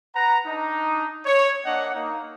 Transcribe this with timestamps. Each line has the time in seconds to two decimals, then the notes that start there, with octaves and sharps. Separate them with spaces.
0.15 B4 F#5 A#5
0.47 D4 D#4
1.26 C#5
1.65 A#3 D4 D#5 F#5
1.95 A#3 D#4